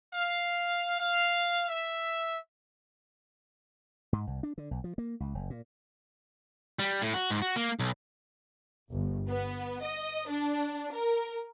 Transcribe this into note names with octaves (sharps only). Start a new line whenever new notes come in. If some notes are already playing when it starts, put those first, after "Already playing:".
F5
F5
E5
G#2
C2
D4
D3
B1
F3
A#3
C#2
F#1
A#2
G3
A2
F#4
G#2
F#4
A#3
B1
G1
B3
D#5
D4
A#4